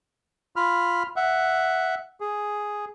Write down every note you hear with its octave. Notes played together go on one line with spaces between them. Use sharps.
F4 B5 F6
E5 F#5
G#4